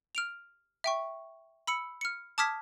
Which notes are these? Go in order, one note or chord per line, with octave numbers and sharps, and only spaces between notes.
F6 D7 F7
E5 G5 C#6
B5 E6 C#7
F6 C#7
A5 D6 D#6 F6 G#6 B6